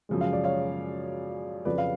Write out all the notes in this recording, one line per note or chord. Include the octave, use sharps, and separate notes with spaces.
F#2 C#3 F3 G#3
F5
D5
C#5 F5
F2 C#3 F#3 B4 D5
F5